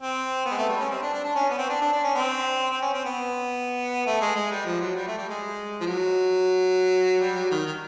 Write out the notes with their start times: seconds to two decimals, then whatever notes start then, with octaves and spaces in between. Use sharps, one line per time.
0.01 C4
0.46 B3
0.52 G#3
0.58 A3
0.69 G3
0.80 C#4
0.91 C4
1.02 D4
1.13 D4
1.24 D4
1.35 C#4
1.50 B3
1.58 C4
1.70 D4
1.81 D4
1.93 D4
2.03 C#4
2.15 C4
2.71 C4
2.82 C#4
2.94 C4
3.05 B3
4.06 A3
4.21 G#3
4.36 G#3
4.51 G3
4.65 F3
4.80 F#3
4.95 G3
5.07 A3
5.18 G3
5.29 G#3
5.81 F3
5.86 F#3
7.20 G3
7.35 F#3
7.51 D#3
7.66 D#3